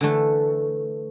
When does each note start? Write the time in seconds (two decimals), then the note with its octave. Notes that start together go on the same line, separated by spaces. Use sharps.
0.01 D3 E3 A3